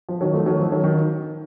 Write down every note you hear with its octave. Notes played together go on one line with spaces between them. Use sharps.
F3
D#3 F#3
F3 A3
D#3 F#3
F3
D#3 F#3
D#3